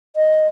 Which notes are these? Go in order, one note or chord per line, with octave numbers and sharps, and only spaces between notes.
D#5